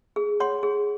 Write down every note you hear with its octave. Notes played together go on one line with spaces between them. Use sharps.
G#4
C#5 F#5 C6
G#4